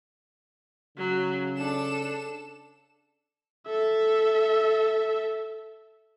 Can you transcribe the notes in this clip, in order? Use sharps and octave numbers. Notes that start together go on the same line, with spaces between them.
C#3 F#3
D4 A4 E7
A4 E5